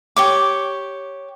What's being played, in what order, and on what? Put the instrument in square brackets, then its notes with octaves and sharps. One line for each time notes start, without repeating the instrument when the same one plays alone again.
[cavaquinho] G4 C#5 D6